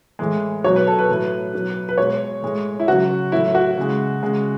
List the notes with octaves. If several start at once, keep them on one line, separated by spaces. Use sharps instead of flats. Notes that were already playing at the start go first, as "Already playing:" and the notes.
A2 E3 G#3
B2 F#3 C#5
B4
A4
B4
A2 F#3
B2 F#3
B4
B2 G#3 C#5
A2 G#3
E4
C#3 F#3 F#4
A2 F#3 E4
F#4
C#3 G#3
C#3 G#3